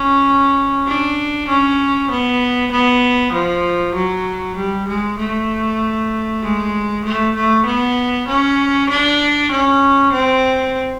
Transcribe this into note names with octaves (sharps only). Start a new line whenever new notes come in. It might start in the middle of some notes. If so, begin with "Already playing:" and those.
Already playing: C#4
D4
C#4
B3
B3
F3
F#3
G3
G#3
A3
G#3
A3
A3
B3
C#4
D4
C#4
C4